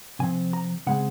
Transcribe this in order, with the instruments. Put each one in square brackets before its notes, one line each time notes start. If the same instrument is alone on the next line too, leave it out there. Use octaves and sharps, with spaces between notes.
[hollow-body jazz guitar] C3 F3 C4 G#5
A#5
C#3 G#3 C4 F#5